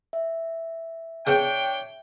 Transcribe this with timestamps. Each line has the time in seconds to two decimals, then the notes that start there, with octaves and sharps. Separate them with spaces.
0.13 E5
1.27 C#3 B3 C#4 D4 C#5 G5